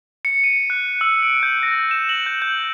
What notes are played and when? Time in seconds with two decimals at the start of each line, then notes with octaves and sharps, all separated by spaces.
0.25 C#7
0.44 D#7
0.70 F#6
1.01 E6
1.23 D7
1.43 G6
1.63 A#6
1.91 E7
2.09 F#7
2.26 G6
2.42 G6